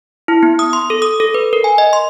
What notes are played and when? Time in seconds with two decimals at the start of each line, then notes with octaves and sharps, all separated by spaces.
0.28 E4
0.43 B3
0.59 D#6
0.73 C6
0.90 A4
1.02 D#6
1.20 A4
1.34 B4
1.53 A#4
1.64 G#5
1.78 D#5
1.93 C6